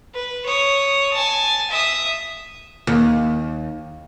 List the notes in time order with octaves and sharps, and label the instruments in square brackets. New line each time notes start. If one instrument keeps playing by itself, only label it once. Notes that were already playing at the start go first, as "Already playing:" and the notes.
[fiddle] B4
C#5 D#6
G#5 A5
E5 D#6
[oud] D#2